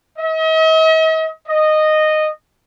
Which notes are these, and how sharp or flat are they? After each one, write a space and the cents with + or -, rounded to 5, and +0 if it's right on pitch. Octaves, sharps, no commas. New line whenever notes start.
D#5 +45
D#5 -10